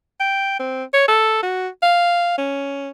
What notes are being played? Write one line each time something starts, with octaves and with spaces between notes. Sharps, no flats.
G5
C4
C#5
A4
F#4
F5
C#4